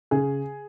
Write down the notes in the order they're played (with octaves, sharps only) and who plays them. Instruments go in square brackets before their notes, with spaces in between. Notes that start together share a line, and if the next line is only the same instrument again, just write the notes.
[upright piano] C#3 G#4